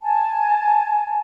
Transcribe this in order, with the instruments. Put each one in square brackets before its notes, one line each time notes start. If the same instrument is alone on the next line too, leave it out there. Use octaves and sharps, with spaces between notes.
[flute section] G#5 A5